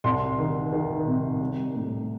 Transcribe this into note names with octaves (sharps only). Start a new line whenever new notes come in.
C2 C6
D#3
D#3
C3
G3
A2